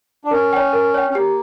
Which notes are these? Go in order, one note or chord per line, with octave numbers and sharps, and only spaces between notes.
D4
C#4 A#4
C#5 G5
A#4
C#5 G5
C#4
A#3 G4